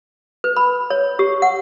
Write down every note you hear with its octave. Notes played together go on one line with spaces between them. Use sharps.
B4
B5
C#5
G4
F#5